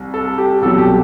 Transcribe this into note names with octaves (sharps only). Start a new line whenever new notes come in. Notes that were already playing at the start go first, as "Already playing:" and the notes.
Already playing: C2
A4
G4
C2 B2 F#3 A4
G4